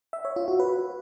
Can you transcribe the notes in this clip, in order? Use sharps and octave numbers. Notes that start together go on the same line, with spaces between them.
E5
C#5
F4
F#4
B4